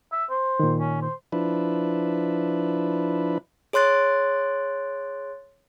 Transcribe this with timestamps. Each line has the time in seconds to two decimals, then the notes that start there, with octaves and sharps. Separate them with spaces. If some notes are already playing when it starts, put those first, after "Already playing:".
0.12 E5
0.30 C5
0.60 A#2 D#3
0.80 C#4
1.02 C5
1.32 F3 D4 E4 B4
3.73 G#4 C#5 C6 F#6 A6 D7